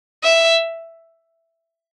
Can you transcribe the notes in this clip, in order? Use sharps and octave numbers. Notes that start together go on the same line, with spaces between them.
E5